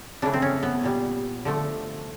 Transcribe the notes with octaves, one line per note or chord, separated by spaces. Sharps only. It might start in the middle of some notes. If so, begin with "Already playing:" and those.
C#3 E3 A3 D4
C4
C#4
B3
A#2 G3
D3 F3 A3